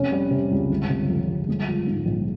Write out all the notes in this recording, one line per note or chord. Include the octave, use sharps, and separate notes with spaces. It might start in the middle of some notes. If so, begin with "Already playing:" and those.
Already playing: F1 C#4
G3
C3
C#2
G1
C3
F2
G1
G#3
F3
G#2
A#1